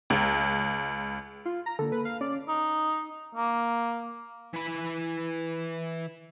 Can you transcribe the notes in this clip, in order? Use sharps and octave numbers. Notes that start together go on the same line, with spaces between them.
C#2
F4
A#5
D3 A#3 A4
B4
F5
C#4 D5
D#4
A#3
E3 B5